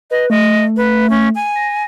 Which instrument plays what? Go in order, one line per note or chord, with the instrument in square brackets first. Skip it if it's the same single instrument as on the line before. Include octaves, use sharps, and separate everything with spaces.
[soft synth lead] B4 [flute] D#5
[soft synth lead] A3 [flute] D#5
[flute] B4
C#4
G#5
[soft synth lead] A#6